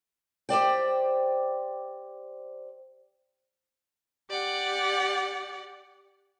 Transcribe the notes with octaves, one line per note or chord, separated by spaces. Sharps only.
G4 C5 D5 G5
G4 D5 F#5